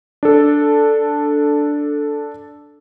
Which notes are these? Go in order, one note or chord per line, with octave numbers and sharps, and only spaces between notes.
D4 A4